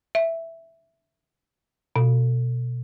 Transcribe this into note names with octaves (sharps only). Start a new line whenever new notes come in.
E5
B2